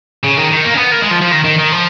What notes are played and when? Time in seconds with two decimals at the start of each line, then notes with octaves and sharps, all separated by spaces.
0.24 C#3
0.38 D#3
0.52 D#3
0.65 A#3
0.74 C#4
0.78 B3
0.92 A#3
1.02 G#3
1.11 F3
1.22 F3
1.32 D#3
1.44 D#3
1.58 D#3
1.72 F3